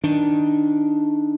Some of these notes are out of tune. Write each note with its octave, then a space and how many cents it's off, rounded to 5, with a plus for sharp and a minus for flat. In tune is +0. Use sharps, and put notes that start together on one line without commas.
D#3 +5 D4 +0